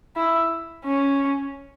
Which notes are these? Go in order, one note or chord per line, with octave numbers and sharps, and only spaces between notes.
E4
C#4